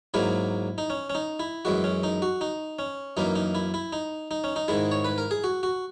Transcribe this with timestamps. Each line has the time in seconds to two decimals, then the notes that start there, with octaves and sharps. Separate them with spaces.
0.14 G#2 F#3 A#3 E4
0.78 D#4
0.90 C#4
1.10 C#4
1.15 D#4
1.40 E4
1.65 F#2 E3 G#3 F#4
1.84 C#4
2.03 D#4
2.22 F#4
2.41 D#4
2.79 C#4
3.17 F#2 E3 A#3 D#4
3.36 D#4
3.55 E4
3.74 E4
3.93 D#4
4.31 D#4
4.44 C#4
4.56 D#4
4.68 G#2 D#3 G#3 E4
4.92 C#5
5.05 B4
5.18 A#4
5.31 G#4
5.44 F#4
5.63 F#4